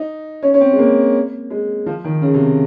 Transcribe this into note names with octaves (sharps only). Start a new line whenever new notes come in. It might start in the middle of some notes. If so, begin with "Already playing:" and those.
Already playing: D#4
C#4
C#4
C4
G#3
A#3
G#3
F3
D#3
C#3
C3